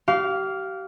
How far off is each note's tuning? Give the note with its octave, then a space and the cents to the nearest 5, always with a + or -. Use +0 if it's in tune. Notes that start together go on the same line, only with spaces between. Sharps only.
G4 -35 F5 +0